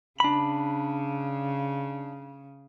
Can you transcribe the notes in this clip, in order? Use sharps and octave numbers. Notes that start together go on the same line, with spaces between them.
C#3 D4 B5